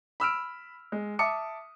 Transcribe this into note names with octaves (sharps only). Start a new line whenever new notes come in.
B5 E6 F6 D7
G#3
E5 A5 D6 D#6 C#7